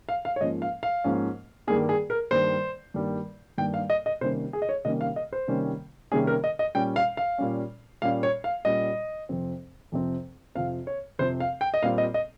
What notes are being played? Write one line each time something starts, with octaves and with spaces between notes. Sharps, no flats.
F5
F5
C#5
G#2 F3 A#3 C#4 D#5
F5
F5
G#2 F3 A#3 C#4
G2 D#3 G3 A#3 G#4
G#4
A#4
G2 D#3 G3 A#3 C5
G2 D#3 G3 A#3
G2 D#3 G3 A#3 G5
F5
D#5
D#5
C3 D#3 G3 A#3 C#4 C5
G#4
D#5
C#5
C3 D#3 G3 A#3 C#4 D#5
F5
D#5
C5
C3 D#3 G3 A#3 C#4
C3 D#3 G3 A#3 C#4 G#4
A#4
D#5
D#5
A#2 G3 C#4 G5
F5
F5
A#2 G3 C#4
A#2 G3 C#4 F5
C#5
F5
A#2 G3 C#4 D#5
F2 C3 F3 C4
F2 C3 F3 C4
F2 C3 F3 C4 F5
C#5
F2 C3 F3 C4 C5
F5
G5
D#5
A#2 G3 C4 F5
D#5
D#5